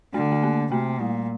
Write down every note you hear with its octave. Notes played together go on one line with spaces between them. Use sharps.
D3 A3
A3
A#3
C3 A3
A#2 G3